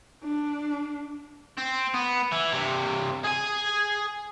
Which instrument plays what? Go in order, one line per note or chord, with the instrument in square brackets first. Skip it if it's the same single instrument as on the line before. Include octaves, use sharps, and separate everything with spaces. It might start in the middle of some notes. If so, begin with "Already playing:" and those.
[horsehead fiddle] D4
[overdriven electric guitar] C4
B3
E3
G2 C3
G#4 G#5